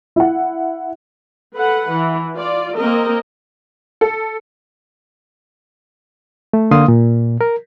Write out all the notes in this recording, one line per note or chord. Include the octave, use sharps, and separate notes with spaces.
E4 F#5
A4 B4 F#5
E3
F4 D5
A#3 C4 A#4 D#5
A4
A3
D3 A#3 F5 C6 D#6
A#2
A#4